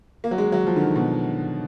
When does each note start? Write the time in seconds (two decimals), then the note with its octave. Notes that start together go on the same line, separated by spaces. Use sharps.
0.24 A#3
0.31 F#3
0.38 G#3
0.52 F#3
0.67 F3
0.76 D3
0.81 D#3
0.95 B2